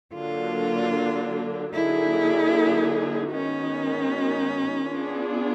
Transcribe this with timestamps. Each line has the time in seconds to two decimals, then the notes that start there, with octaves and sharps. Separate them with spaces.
0.14 D3 F#3 A#3 D4 F4
1.73 D3 F#3 A#3 D#4 E4 G#4
3.31 D#3 G#3 B3 C#4 D#4 F#4
4.89 B3 D4 F4 G#4